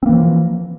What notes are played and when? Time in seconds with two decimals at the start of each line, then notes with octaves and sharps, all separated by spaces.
0.03 C4
0.06 A#3
0.09 E3
0.12 F3